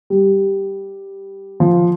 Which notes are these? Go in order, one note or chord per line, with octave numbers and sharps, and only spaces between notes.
G3
F3